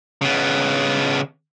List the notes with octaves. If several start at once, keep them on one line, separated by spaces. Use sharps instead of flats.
C#3 B3